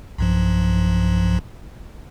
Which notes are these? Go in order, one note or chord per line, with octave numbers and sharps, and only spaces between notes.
B1 G2 F3